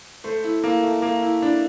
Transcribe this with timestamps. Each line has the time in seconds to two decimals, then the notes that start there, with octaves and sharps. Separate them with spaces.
0.24 A3 C5
0.44 E4
0.63 A#3 E4
0.83 A3
1.02 A3 A#3
1.23 E4
1.42 D4 E4